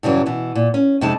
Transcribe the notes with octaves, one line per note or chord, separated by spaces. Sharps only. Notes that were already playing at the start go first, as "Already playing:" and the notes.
G2 C#3 E3 F#3
B2 E3
A#2
C#4
F2 C3 G#3 D#4 A5